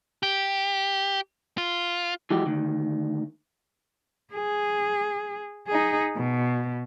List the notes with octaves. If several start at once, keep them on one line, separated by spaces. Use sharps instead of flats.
G4
F4
E3 F3 G#3 F#4 G4
D2 D#3
G#4
D#4 G#4
B2